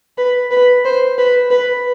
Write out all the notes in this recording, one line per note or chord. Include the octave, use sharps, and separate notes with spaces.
B4
B4
C5
B4
B4